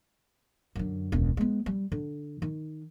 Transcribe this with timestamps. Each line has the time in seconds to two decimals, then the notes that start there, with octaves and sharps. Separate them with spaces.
0.76 F#2 D3
1.12 E1 C#2
1.37 G#3 B3
1.66 G3
1.92 D3
2.42 D#3